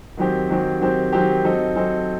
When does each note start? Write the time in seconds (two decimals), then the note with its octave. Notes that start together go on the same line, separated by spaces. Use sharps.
0.17 D#3 F#3 C4 G4
0.49 D#3 F#3 C4 G4
0.81 D#3 F#3 C4 G4
1.12 D#3 F#3 C4 G4
1.44 F#3 C4 D#4 A4
1.76 F#3 C4 D#4 A4